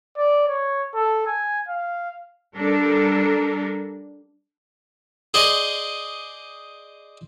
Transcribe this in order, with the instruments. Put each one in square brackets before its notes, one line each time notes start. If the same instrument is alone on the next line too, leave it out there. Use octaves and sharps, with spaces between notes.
[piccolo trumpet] D5
C#5
A4
G#5
F5
[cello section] G3 D4 A4 A#4
[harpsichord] G#4 C5 D5 D#5